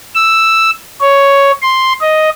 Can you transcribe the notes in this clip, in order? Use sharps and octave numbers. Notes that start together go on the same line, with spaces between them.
E6
C#5
C6
D#5